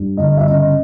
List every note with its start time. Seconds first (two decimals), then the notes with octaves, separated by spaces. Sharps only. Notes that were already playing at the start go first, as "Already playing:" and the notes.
Already playing: G2
0.17 G1 D#5
0.37 E5
0.48 C#3 D#5